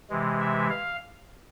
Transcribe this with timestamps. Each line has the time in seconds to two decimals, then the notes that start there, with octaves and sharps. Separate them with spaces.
0.10 C3 E3 G#3
0.40 E5
0.69 F5